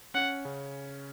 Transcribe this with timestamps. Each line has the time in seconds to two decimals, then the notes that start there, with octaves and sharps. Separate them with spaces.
0.14 C#4 F#5
0.45 C#3